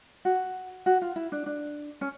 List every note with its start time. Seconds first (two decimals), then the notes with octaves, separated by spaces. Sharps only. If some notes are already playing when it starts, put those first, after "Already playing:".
0.25 F#4
0.86 F#4
1.02 F4
1.16 E4
1.32 D4
1.46 D4
2.01 C#4